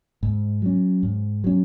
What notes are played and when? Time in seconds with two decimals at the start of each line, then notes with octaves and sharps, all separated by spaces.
0.23 G#2
0.62 F#3 C#4
1.03 G#2
1.44 F#3 C#4